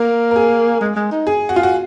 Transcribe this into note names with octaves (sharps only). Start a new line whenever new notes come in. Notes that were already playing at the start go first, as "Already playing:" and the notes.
Already playing: A#3 A#4
A#4
G#4
G#3
G#3
D#4
G#4
F#4
F4
F#4